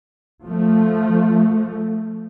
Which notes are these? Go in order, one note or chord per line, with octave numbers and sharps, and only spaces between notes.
F3 A3